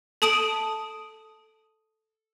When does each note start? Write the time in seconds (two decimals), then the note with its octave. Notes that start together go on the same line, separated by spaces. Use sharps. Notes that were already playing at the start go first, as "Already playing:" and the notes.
0.22 A4 A5 D#6 D7 D#7 F#7